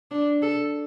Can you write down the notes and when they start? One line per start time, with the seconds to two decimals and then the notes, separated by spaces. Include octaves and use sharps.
0.11 D4
0.42 A4